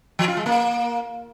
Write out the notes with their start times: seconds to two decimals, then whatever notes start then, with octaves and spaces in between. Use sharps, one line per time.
0.19 F3
0.28 F4
0.37 G#3
0.46 A#3